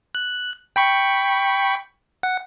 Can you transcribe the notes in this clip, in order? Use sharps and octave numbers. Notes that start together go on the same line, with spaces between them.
F#6
G5 B5 C#6
F#5